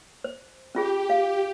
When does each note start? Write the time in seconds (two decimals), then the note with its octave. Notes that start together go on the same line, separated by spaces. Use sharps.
0.24 C5
0.75 C#4 F4 G4 G#4
1.10 F5